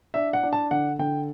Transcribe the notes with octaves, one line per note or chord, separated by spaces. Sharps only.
D4 E5
F#5
D4
A5
D3 F#5
D3 G5